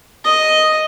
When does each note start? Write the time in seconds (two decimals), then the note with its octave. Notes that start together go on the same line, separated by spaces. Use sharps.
0.25 D#5